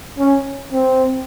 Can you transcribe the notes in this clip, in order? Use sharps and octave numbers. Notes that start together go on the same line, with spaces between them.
C#4
C4